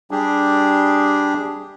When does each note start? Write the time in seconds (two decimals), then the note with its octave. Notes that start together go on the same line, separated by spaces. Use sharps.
0.11 G3 D4 G4 G#4